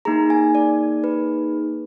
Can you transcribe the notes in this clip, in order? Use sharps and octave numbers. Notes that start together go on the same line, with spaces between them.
A#3 D#4 G#4 A#5
G#5
D5
B4